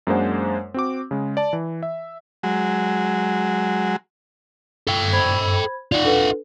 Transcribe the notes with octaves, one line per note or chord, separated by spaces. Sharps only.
F#2 G#3 A#3 D4 C5 F#5
C4 F#4 D6
C#3 G#3
D5 A5
E3
E5
F#3 G#3
A4 G5 E6
C5 B5 G#6
D#4 F4 D5 F#5
D4 A4 B4